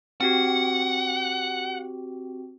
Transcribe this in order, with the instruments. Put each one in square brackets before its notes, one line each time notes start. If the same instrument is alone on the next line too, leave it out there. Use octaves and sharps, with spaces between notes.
[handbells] C4 F#4 G4 [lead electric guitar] F#5